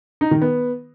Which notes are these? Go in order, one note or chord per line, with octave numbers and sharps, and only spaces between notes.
D#4
D#3
B3